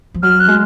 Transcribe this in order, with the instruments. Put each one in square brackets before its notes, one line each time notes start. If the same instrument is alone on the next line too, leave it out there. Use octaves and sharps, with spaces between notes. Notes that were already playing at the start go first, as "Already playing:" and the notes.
[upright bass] F3
[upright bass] F#3 [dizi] F6
[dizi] F#6
[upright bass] G#3